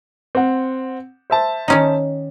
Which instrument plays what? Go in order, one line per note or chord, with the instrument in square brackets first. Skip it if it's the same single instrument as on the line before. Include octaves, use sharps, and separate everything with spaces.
[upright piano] C4 F#5
C5 E5 A5
[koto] D#3 C#4 D#4